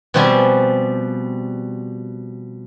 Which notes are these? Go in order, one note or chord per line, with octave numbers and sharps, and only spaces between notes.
B2 F3 G3 C4 E5 G#5